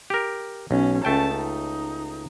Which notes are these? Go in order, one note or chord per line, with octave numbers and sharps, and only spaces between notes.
G4 A#4
B1 C#4
C#2 A3 C#4 G5 A5
D#4